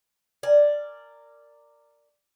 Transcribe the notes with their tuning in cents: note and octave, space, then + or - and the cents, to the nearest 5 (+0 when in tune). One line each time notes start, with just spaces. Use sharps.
A#4 -15 D5 +0 G#5 +0